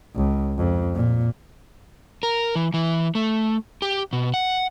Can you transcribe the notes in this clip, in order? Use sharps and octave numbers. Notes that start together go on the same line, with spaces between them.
C#2
F2
A#2
A#4
E3
E3
A3
G4
B2
F#5